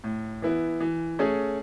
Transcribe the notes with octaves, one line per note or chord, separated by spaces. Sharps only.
A2
E3 B3 E4
E3
A3 C#4 G#4